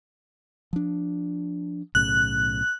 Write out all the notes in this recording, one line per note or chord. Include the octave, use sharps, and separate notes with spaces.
F3 D4
B1 A2 C#3 F#6